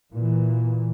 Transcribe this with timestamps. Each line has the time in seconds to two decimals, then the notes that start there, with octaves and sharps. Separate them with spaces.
0.12 A#2 E3